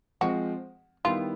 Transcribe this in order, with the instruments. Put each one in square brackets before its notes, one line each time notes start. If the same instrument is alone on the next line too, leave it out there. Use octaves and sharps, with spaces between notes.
[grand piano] F3 G#3 C4 [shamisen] F#4
[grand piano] D#3 G3 B3 E4 [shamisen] F4